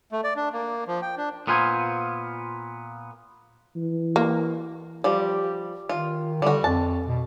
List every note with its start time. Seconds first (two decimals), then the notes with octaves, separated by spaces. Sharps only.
0.12 A3
0.24 D5
0.36 D4
0.53 A#3
0.87 F3
1.02 G5
1.18 D4
1.47 A#2 B3 F4 C5 G#5
3.76 E3
4.16 A#3
5.04 F3 G3 G4
5.89 D#3 F4
6.42 D3 G3 F#4
6.64 F2 A5
7.06 B2